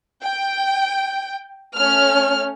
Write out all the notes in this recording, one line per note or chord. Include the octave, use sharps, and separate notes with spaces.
G5
A3 C#4 F6